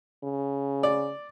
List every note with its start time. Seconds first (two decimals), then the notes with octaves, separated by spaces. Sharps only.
0.23 C#3
0.83 D5